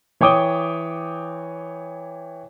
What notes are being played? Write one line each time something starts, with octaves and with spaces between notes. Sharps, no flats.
E3 C#5 G5 D6 D#6 G7